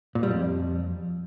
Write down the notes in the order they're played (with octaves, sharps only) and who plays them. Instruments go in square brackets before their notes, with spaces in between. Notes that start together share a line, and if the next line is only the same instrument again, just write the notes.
[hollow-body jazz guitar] A#2
G3
F2